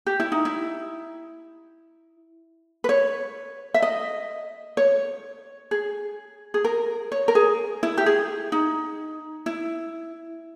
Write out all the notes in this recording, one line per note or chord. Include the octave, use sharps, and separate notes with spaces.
G4
E4
D#4
E4
B4
C#5
E5
D#5
C#5
G#4
G#4
A#4
C#5
A#4
G#4
E4
G4
G#4
D#4
E4